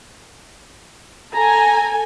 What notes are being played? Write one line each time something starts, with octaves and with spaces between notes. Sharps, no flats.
A4 G#5 A#5